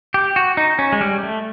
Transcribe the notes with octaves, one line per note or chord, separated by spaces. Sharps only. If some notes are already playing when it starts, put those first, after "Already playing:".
G4
F#4
D#4
C#4
G#3
G3
A3